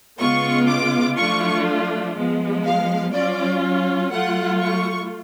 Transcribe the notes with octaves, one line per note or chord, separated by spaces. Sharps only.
C#3 G#3 B3 F4 C#6
D6
F3 A3 D4 F4 C#6
F3 G#3 B3
F5
F#3 C#4 F4 D5
F#3 A3 F4 F#5
C#6